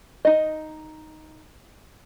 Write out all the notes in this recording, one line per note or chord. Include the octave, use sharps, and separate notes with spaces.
D#4 D#5